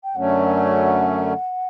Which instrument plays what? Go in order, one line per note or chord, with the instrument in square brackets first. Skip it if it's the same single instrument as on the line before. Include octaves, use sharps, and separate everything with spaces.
[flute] G5
[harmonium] F#2 D3 F#3 A3 C#4 [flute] F#5